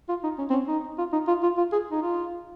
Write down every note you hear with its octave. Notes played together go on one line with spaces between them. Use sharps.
F4
D#4
C#4
C4
C#4
D#4
F4
D#4
F4
F4
F4
G#4
D#4
F4